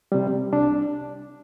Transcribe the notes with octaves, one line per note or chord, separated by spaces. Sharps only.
C3 G3
C2 D4